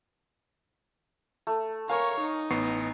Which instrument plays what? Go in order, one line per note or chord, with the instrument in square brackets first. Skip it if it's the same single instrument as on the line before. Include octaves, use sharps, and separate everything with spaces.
[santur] A3
[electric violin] A#4 C#5 [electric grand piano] F5 C#6 [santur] G#5
[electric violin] D#4
[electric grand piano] A1 B3 C7 [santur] C#5